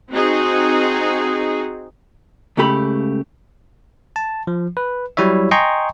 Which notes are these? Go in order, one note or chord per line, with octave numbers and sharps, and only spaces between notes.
C4 D#4 F#4 G#4
C#2 C#3 A3 G4 B5
A5
F3
B4
F#3 G3 E4 C#5 E5
D#5 G5 G#5 A#5 C6 C#6